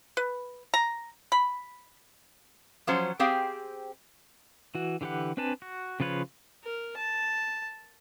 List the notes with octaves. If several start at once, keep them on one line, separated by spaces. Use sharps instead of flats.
B4
A#5
B5
F3 F#3 C#4 C5
C4 G4 G#4 C5 F5 G5
E3 F#4
D3 E3 G4 B4 F#5
C4 D4 B4 G#5 A5
F#4
C#3 F3 F4 B4 C#5
A#4
A5